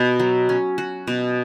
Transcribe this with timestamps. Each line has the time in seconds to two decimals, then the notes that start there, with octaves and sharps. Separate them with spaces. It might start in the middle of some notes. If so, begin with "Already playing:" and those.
Already playing: B2 F#4
0.20 F#3
0.49 C#4
0.78 F#4
1.07 B2